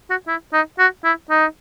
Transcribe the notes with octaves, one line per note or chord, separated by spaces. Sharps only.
F#4
E4
D#4
F#4
E4
D#4